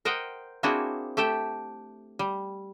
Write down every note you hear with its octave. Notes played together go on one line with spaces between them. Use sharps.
A#4 C5 D#5 F#5 G5
A#3 C4 D4 E4 F#4 G#4
A3 G4 A4 E5 G5
G3